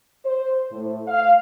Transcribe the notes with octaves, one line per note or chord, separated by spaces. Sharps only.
C5
A2
F5